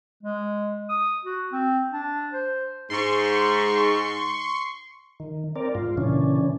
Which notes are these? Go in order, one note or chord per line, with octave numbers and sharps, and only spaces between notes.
G#3
D#6
F#4
C4
D4
C5
G#2 C6 C#6
D#3
C4 A#4 D5
G#2 F4
A#2 C#3 E3 C#4 D4